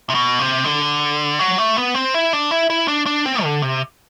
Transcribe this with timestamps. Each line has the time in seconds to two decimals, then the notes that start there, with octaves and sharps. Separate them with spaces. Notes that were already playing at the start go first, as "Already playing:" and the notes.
0.10 C3
0.15 B2
0.39 C3
0.64 D3
1.39 F#3
1.58 A3
1.77 B3
1.95 C4
2.14 E4
2.33 D4
2.51 E4
2.70 E4
2.88 D4
3.06 D4
3.26 C4
3.43 D3
3.62 C3